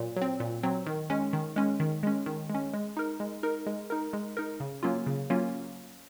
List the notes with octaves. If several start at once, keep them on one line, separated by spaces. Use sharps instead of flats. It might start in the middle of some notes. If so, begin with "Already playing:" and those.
Already playing: A#2 F#3
F#3
C4
A#2
F#3 C4
D#3
G#3 C#4
D#3
G#3 C#4
D#3
G#3 C#4
D#3
G#3 C#4
G#3
D#4 A#4
G#3
D#4 A#4
G#3
D#4 A#4
G#3
D#4 A#4
C#3
F#3 A#3 C#4 F4
C#3
F#3 A#3 C#4 F4